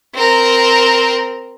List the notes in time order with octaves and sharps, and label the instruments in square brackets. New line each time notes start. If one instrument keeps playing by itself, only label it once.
[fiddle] C4 A#4